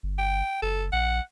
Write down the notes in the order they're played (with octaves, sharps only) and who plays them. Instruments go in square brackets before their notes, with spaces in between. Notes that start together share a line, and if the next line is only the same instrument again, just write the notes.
[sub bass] G1
[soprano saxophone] G5
[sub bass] F#1 [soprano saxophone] A4
[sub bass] A#1 [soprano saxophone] F#5